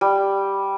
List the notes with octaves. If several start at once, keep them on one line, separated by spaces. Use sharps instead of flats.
G3